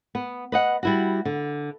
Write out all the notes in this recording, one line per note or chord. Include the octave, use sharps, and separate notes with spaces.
B3
B4 D#5 F#5
G3 E4 F#4
D3